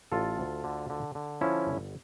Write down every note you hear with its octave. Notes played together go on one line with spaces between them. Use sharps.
A1 F4 A4
D2
D3
D3
D3
F3 C#4 E4
G1